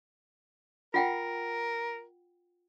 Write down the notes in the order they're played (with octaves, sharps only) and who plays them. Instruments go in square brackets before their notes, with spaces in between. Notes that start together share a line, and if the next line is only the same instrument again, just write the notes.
[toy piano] F4 F#5 G5 [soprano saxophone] A#4